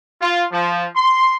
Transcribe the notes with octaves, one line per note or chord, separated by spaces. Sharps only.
F4
F3
C6